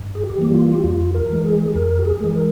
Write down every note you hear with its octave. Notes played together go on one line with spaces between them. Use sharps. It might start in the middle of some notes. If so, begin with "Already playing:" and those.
Already playing: G2
G#4
G4
E3 G3 A#3
F4
G4
F2 F4
A#4
E3 G#3
G#4
F2 A#4
G4
G#4
E3 G#3
A#4